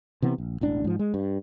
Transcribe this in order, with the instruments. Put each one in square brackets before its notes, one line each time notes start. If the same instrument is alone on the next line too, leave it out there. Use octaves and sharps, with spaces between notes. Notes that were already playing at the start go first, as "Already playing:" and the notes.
[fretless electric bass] C3 E3 B3
A#1
E1 A1 D4
G#2 F3
G#3
G2